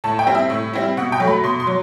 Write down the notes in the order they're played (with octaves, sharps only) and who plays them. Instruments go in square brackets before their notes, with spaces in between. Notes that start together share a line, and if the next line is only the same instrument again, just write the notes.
[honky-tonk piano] A2 A5
G5
G3 C4 E4
E5
A2
G3 C4 E4
B2 F#5
G5
F#3 A3
B5
B2 C6
C6
F#3